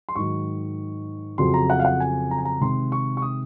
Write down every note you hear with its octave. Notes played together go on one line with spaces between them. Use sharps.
C6
G#2 D#3 F#3 C#6
F2 C#3 F#3 C4 C6
A#5
F#5
F5
F#5
G#5
A#5
G#5
A#5
C3 D#3 G#3 C4 C6
C#6
C#6
D#6